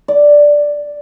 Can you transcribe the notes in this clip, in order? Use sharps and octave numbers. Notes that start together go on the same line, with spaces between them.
D5